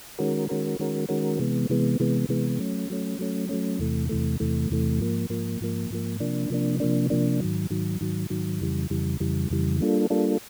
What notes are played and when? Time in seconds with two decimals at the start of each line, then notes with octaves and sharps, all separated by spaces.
0.18 D#3 G#3 C#4 F#4 A#4
0.49 D#3 G#3 C#4 F#4 A#4
0.79 D#3 G#3 C#4 F#4 A#4
1.09 D#3 G#3 C#4 F#4 A#4
1.39 C3 E3 G#3 B3
1.69 C3 E3 G#3 B3
2.00 C3 E3 G#3 B3
2.29 C3 E3 G#3 B3
2.59 F#3 A3 C#4
2.90 F#3 A3 C#4
3.19 F#3 A3 C#4
3.49 F#3 A3 C#4
3.79 E2 C3 E3 A3
4.09 E2 C3 E3 A3
4.40 E2 C3 E3 A3
4.70 E2 C3 E3 A3
4.99 G#2 F3 A#3
5.30 G#2 F3 A#3
5.60 G#2 F3 A#3
5.90 G#2 F3 A#3
6.20 C3 F3 A#3 D4
6.50 C3 F3 A#3 D4
6.80 C3 F3 A#3 D4
7.10 C3 F3 A#3 D4
7.40 G#2 D#3 F#3
7.70 G#2 D#3 F#3
8.01 G#2 D#3 F#3
8.30 G#2 D#3 F#3
8.61 F2 C#3 E3 G3
8.90 F2 C#3 E3 G3
9.20 F2 C#3 E3 G3
9.50 F2 C#3 E3 G3
9.81 G3 A#3 D4 F4 A4
10.10 G3 A#3 D4 F4 A4